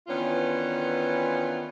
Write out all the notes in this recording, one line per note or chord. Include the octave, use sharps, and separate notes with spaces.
D#3 E3 B3 C#4 D4 F4